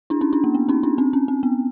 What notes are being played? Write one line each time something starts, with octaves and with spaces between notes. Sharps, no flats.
D4 E4
C#4 D#4
D4 E4
A#3
B3
C#4 D#4
D4 E4
C4 D4
C#4
C4
B3